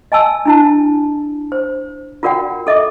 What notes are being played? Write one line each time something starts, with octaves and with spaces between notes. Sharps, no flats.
D#5 G#5 A5 E6
D4 E4 A5
C5
F4 F#4 A#4 D5 F#5 G5
A4 D#5 E5 D6